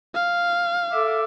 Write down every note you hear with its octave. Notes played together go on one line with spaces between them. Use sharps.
F5
A4 E5 D6